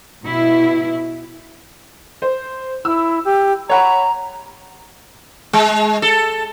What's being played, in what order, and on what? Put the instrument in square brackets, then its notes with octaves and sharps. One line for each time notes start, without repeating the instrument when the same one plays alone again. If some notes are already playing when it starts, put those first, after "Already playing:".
[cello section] B2 E4
[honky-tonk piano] C5
[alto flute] E4 [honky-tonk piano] E6
[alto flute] G4
[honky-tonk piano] C#5 F#5 B5 [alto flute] A#5
[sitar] G#3
A4